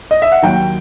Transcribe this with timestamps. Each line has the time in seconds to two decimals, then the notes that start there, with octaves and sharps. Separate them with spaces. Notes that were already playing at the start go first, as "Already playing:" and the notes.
0.11 D#5
0.22 E5
0.32 F#5
0.42 D#2 D#3 F#3 G5